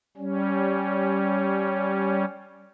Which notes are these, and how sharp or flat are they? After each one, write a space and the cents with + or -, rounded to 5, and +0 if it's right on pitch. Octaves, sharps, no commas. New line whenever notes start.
G3 -15 C#4 +0